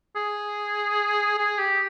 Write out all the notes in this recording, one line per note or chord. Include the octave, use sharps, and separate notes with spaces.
G#4
G#4
G4